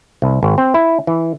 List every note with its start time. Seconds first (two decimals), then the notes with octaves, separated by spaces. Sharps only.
0.22 C2
0.43 G#1
0.58 C4
0.74 E4
1.07 E3